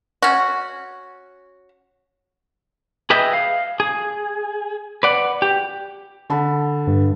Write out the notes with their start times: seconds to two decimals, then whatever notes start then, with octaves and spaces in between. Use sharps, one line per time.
0.22 C#4 F#4
3.10 G#4 B4 D#5 E5 G5
3.33 F5
3.80 G#4
5.03 B4 D5 F#5
5.42 G4
6.30 D3 A5 B5
6.87 G2